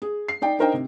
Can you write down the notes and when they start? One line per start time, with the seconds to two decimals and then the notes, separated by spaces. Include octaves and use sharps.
0.02 G#4
0.28 C7
0.42 D#4 D5 G5
0.59 D4 D#4 A#4 C5 D#5 G5
0.74 C3